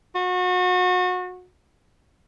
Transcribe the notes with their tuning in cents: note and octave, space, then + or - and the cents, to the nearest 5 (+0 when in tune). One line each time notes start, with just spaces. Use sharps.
F#4 -30